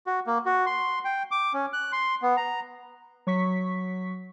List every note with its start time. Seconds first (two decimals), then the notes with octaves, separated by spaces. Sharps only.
0.07 F#4
0.27 A#3
0.45 F#4
0.66 C6
1.05 G5
1.31 D6
1.53 C#4
1.73 F#6
1.92 C6
2.22 B3
2.37 A#5
3.27 F#3 C#6 B6